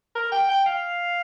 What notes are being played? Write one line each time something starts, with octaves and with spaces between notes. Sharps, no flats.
A#4
G5
G5
F5